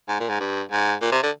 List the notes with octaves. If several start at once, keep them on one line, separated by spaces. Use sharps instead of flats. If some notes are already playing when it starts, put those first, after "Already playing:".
G#2
A#2
G#2
G2
G#2
A#2
C3
D3